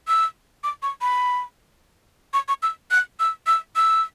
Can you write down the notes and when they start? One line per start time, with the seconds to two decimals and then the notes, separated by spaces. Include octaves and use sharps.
0.08 E6
0.64 D6
0.83 C#6
1.01 B5
2.34 C#6
2.48 C#6
2.63 E6
2.91 F#6
3.20 E6
3.47 E6
3.76 E6